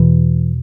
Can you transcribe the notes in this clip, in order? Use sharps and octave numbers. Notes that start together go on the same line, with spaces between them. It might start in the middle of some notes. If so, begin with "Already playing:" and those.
Already playing: E2 B2 E3